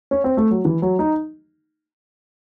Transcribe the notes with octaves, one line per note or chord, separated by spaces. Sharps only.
C#4
C4
A3
F#3
E3
F#3
D#4